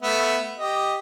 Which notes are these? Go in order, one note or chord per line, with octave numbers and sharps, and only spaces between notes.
A3 B3 E5
G4 D#5